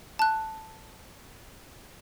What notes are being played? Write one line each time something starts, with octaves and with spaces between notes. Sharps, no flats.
A5 F#6